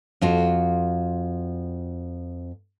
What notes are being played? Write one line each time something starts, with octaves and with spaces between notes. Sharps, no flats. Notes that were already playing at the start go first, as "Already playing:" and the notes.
F2 F4 F#4